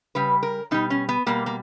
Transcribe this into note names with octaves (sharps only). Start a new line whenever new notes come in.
C#3 G3 B4
A#4
B2 G3 D#4
C#4
B3
B2 G3 A#3
A#3